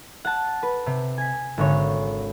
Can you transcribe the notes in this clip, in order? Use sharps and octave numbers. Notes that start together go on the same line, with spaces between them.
F#5 A5
B4
C3
G#5 B6
G#1 D3 C#5